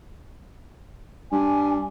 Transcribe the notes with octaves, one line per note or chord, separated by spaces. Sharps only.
G2 G#5